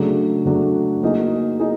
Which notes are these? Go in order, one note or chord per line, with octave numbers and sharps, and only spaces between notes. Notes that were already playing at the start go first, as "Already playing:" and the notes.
Already playing: C#3 F#3 A3 D4
C#3 F#3 A3 D4
F#3 A#3 D#4 G#4
D#4 G#4